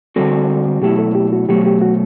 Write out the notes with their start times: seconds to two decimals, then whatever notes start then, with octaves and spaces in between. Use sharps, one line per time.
0.16 D3 G3 C4 F#4 A4
0.82 B2 F#3 A3 E4 G4
0.99 A4
1.15 G4
1.33 F#4
1.49 B2 F#3 A3 G4
1.66 G4
1.81 F#4